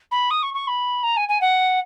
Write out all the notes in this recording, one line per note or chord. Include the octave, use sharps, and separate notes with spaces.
B5
D#6
C#6
C#6
B5
A#5
G#5
G#5
F#5